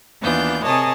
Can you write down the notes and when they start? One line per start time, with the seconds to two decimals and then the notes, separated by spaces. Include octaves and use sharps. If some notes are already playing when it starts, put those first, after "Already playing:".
0.19 D#2 E3 B3 D4 F4 G6
0.62 C3 G#4 A#4 C#5 D#5 A5